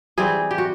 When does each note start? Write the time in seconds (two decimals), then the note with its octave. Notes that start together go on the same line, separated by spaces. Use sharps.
0.18 E3 G3 C4 G#4
0.51 G4
0.58 F#4